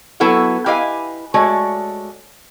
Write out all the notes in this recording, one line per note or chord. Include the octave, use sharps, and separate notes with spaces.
F#3 B3 E4 A4 B4 F#5
E4 G4 B4 D#5 F5 G#5
G#3 A3 F#4 C#5 D5